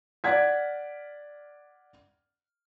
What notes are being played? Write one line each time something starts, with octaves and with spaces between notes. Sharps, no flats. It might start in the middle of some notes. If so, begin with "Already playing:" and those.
D5 F#5 G#6 B6